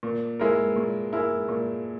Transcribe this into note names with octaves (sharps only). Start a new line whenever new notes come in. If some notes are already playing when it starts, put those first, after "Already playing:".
A#2
G#3 E4 A#4
A#2
G#3 E4 A#4
A#2